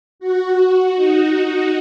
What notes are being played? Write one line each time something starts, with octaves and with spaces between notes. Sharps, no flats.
F#4
D#4